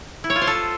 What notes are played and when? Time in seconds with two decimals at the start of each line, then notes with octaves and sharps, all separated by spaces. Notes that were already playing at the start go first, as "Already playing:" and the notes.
0.24 E4
0.30 C#5
0.36 F4
0.41 C5
0.47 A4